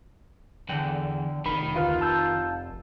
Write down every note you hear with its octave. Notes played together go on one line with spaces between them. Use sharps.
E2 D3 G5
F1 D#3 B5
D2 F4 B4 F5
A5 E6 G6